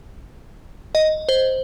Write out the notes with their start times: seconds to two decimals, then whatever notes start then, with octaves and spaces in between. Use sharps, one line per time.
0.95 D#5
1.29 C5